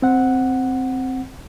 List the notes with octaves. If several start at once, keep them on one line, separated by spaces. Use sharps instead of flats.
C4 F#5